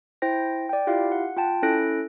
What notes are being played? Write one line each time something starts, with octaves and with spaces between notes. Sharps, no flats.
E4 C5 G5 A#6
D5 G5
E4 F4 G4 F5
F#5
F4 G5 A5
C#4 E4 A4 F#6 A#6 D7